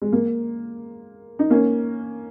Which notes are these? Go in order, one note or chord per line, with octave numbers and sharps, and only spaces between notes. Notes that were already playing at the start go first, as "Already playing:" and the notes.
G#3
A#3
D#4
A#3 C#4